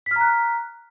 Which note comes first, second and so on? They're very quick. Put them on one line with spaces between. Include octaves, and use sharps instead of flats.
B6 F6 A#5 F#6